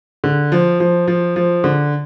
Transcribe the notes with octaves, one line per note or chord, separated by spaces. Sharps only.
D3
F3
F3
F3
F3
D3